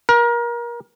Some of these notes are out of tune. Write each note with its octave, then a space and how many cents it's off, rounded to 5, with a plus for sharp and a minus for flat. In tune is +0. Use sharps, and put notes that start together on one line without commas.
A#4 +30